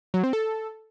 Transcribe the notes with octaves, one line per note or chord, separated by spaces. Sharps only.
F#3
C4
A4